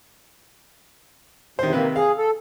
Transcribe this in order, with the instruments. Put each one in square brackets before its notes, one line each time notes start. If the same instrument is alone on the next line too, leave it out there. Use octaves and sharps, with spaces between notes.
[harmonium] E2 C3 [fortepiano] D#3 C5
[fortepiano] C3 D#3 B4 [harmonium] A#3
[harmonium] G#4 [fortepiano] F5
[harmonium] A4